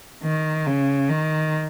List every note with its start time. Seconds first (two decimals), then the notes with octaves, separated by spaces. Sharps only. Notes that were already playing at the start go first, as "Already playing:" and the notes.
0.23 D#3
0.67 C#3
1.09 D#3